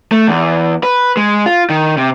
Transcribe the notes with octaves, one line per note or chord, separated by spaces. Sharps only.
A3
E2
B4
G#3
F4
D#3
C3